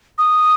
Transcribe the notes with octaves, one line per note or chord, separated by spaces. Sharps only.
D#6